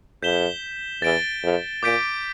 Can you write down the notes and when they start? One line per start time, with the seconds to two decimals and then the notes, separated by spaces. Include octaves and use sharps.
0.22 F2 G6 B6 E7 G7
1.02 E2 A6 D7 G7
1.43 F2
1.82 A#2 D6 G6 B6 D7